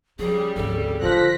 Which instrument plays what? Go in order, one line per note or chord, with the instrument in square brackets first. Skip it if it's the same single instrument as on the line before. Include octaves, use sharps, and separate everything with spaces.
[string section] C#3 G3 [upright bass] F3 [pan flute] G#4
[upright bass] G#1 D2 [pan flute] A4
[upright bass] D3 D4 [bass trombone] F3 [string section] F#6 A#6 B6